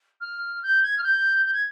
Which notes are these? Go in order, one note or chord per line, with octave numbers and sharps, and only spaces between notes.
F6
G6
G#6
F6
G6
G6
G#6